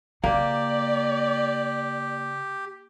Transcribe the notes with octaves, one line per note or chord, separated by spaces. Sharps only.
C#3 A#3 G4 D5